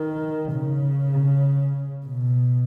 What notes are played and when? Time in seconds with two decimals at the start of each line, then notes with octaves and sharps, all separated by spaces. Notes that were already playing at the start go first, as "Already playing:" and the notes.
Already playing: D#3
0.53 C#3
2.06 B2